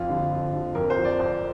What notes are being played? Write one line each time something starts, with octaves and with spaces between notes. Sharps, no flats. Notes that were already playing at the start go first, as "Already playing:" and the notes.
Already playing: F2 F4
D3 F3
F2
D3 F3
F2 A#4
C5
F3
D5
F2 C5